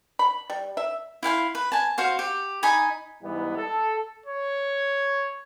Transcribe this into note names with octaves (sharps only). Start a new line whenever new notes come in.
B5
G3
E5
E4 F5 G5 C6
B4
G#5 A5
F#4 C5 F5
G4
D#4 D#5 G#5 B5
G#2 E3 G3 B3
A4
C#5